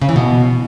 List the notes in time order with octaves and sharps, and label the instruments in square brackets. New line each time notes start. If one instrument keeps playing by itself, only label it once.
[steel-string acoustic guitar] C#3
E3
B2